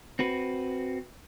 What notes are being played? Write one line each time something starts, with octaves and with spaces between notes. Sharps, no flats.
C4 F#4 B4